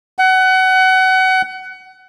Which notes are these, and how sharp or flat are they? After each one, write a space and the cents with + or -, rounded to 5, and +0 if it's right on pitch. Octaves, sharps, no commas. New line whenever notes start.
F#5 +25